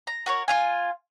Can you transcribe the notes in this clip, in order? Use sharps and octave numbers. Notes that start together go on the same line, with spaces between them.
A#5
F#4 A#4 C#5
F4 F5 G#5